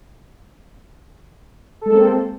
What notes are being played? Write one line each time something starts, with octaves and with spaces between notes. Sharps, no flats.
G#3 A#3 C4 A4